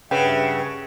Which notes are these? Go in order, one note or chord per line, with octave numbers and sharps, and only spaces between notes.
G2 C#3 B4 E5 F#5 G5